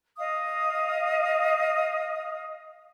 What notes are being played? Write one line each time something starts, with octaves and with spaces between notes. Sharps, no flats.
D#5 F5 D#6